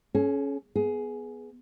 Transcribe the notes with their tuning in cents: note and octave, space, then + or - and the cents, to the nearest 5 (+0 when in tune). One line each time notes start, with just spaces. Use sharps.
C#4 +0 G#4 +45
B3 +0 G#4 +15